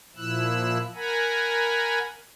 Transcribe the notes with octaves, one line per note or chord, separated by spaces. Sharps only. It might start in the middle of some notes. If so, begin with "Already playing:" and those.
A#2 F3 E4 E6 F#6
A#4 F#5 G#5 A#5 B5